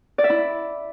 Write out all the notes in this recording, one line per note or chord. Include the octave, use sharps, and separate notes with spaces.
D5
E5
E4